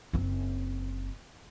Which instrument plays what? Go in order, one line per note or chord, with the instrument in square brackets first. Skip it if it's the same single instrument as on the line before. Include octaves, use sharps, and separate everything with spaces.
[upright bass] F#1 C4